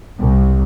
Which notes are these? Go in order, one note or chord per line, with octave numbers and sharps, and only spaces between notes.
C2